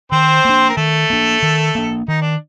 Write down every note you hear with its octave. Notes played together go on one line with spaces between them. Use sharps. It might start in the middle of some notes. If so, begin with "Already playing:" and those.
D#3 C4 C5
A#3 D4
A#4
D#3 A3 A4
A#3 D4
D#3
A#3 D4
D#3 D#4
D4